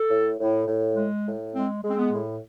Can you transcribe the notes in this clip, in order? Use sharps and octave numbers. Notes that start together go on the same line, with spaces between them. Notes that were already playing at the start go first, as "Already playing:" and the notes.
Already playing: A4
A2
A2
A2
G#3
A2
G#3 C4
G#3
C4
B3
A2